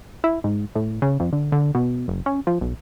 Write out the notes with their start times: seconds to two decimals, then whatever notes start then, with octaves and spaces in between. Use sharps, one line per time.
0.24 E4
0.44 G#2
0.75 A2
1.02 C#3
1.20 F2
1.33 D3
1.52 D3
1.75 B2
2.08 F#1
2.26 C#4
2.47 F3
2.61 B1